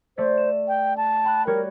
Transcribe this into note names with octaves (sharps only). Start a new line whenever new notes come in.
A3 C5 D5 B6
E7
G5
A5
G5 B5 F#6
G3 F#4 A#4 C#5